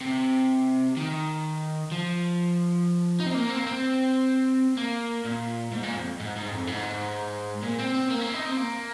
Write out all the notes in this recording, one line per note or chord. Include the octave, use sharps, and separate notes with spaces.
C3
D#3
F3
D#4
C4
A#3
C4
A#3
C4
A#3
A#2
G#2
A#2
F2
G#2
G#2
F2
G#2
A#2
C4
C4
A#3
C4
D#4
C4
A#3